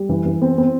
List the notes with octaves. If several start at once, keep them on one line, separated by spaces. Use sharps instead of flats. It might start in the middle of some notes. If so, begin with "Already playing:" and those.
Already playing: G3
E3
E3
C4
C4